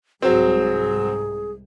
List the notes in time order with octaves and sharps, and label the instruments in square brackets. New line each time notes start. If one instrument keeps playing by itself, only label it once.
[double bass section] C2 G#2 [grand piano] F#3 C4 [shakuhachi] G#4